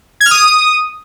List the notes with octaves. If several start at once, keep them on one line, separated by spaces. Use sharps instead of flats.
G#6
F6
D#6